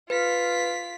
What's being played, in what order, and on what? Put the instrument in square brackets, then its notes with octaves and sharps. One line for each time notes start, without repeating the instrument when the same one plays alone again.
[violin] F4 B6 [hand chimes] B4